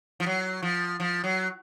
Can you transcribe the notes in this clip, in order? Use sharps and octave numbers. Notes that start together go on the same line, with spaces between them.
F3
F#3
F3
F3
F#3